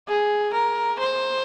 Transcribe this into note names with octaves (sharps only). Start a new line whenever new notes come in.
G#4
A#4
C5